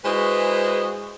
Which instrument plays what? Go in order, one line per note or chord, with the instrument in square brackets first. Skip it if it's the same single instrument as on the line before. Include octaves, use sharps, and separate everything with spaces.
[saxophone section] G#3 E4 F#4 G#4 B4 C5